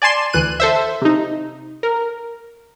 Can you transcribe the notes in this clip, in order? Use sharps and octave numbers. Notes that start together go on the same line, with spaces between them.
D5 G#5 A5 C6 E7
D2 E3 F#6 D#7
A4 C5 E5
C3 D#4
A#4